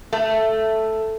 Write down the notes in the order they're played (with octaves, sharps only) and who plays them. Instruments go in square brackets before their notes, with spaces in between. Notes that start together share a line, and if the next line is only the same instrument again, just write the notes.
[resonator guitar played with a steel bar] A3